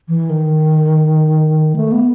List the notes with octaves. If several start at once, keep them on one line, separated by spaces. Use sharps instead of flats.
E3
D#3
A3
B3